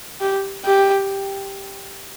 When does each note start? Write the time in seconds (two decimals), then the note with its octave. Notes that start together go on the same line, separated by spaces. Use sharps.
0.20 G4
0.65 G4